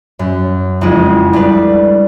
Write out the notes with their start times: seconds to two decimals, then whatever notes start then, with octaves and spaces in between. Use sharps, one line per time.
0.19 F#2
0.81 F#1 F2 G#3 E4 G#4
1.33 G3 A3 D4 B4